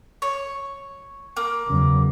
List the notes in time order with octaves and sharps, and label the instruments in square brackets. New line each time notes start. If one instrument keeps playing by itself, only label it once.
[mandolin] C#5
A#3
[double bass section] E2 C#3 F#3